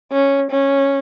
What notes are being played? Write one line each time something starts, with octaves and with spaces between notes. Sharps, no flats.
C#4
C#4